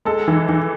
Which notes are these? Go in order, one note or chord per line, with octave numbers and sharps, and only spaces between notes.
G#3 A4
E3
E3